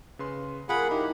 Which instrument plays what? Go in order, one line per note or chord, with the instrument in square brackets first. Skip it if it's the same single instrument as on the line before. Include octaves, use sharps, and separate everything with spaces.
[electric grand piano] C#3 B4 C6
[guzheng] F#3 A#3 [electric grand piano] F4 F5 [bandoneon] G#4 F#5 B5
[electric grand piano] D#4 E4 [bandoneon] G4